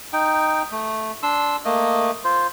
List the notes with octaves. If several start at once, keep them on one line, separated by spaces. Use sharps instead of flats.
D#4 G5
A3
D4 C6 E6
A3 A#3 D#5
F4 C5